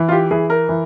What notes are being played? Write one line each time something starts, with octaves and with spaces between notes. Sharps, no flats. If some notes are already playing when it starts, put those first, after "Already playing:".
Already playing: E3
F4
G4
E3 G#4
A#4
E3